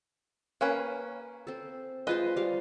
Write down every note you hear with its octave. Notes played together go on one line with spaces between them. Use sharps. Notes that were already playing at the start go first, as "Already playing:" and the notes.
A#3 C#4 B4
C4 A4
G#3 F4 B4 C5 D#5
G3 F5